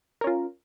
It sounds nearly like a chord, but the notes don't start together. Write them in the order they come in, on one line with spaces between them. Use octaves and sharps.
A#4 C#4 F4